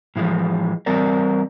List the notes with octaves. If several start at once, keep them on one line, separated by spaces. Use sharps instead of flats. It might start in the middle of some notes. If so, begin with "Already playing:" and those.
A2 E3 F3 G#3
E3 G3 C4 A#4 D5